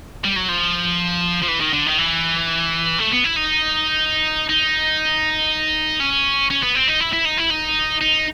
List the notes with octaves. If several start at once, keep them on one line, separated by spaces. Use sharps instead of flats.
G3
F#3
F3
F3
E3
D#3
D3
D#3
E3
A3
B3
E4
D#4
D#4
C#4
C#4
B3
C4
D#4
E4
E4
D#4
E4
D#4
D#4